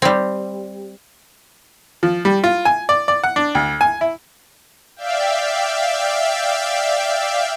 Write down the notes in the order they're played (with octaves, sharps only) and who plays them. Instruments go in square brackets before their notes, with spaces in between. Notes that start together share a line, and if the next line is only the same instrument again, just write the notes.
[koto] G3 C4
[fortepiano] F3
G3
F4
G#5
D5
D5
F#5
D4
D2
G#5
E4
[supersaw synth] D5 E5 F5 G5